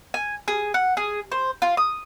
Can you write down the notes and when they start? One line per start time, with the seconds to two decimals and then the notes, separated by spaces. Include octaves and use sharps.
0.14 G#5
0.48 G#4
0.74 F#5
0.97 G#4
1.32 C5
1.62 F4
1.77 D#6